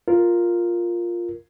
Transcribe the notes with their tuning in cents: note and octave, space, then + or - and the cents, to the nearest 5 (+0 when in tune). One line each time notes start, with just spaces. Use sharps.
F4 +0 A#4 +0